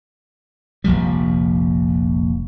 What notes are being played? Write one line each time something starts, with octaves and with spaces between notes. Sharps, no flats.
F1 A#1 F3 G3